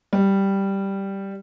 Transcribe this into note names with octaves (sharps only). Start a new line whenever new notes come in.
G3